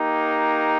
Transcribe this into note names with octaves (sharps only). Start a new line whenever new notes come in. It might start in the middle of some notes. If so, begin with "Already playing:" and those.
Already playing: A#3 D#4 G4